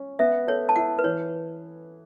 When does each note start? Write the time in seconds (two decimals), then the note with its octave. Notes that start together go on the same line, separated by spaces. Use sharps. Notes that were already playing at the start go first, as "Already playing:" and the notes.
Already playing: C#4
0.19 B3 E5
0.47 A4 C#5
0.69 A5
0.76 E4 F#5
0.99 B4
1.04 E3 C#5